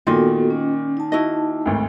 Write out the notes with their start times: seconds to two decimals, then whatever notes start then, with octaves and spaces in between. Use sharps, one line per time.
0.07 A#2 D#3 B3 F4 F#4 A4 D#5
0.50 C#4
0.97 D#4 A5
1.12 E4 F#4 D#5
1.65 G#1 D2